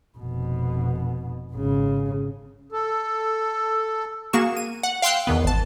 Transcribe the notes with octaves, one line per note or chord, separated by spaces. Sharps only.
F1 B2
G#1 C#3
A4
A#3 F#4 G#4 C#6 E7
D#7
F#5
F5 G5 C6 E6 F#6
E2 D#3 B3
G#1 A5